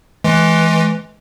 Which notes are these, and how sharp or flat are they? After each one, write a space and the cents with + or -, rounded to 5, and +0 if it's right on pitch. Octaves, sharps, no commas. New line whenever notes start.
E3 +0 G#3 +30